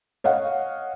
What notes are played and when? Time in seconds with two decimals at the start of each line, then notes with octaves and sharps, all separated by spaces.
0.24 C#5 D#5 F5 F#5